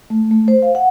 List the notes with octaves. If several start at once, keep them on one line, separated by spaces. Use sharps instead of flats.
A3
A3
C5
F5
F#5